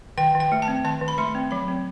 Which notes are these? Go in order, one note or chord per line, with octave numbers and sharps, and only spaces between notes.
D#3 G5
D#3
G5
A3
A5
C4
D#3 A5
D#3
B5
A3 C6
C4
F#3 B5
C4